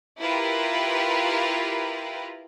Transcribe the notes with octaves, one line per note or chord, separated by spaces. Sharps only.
E4 F4 G4 A#4 B4